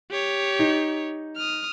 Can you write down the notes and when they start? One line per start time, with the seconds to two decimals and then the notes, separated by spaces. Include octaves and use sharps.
0.11 G4 C#5
0.59 D#4
1.36 D#6 F6